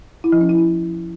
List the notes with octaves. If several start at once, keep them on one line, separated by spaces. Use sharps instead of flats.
E4
F3
C#4
E4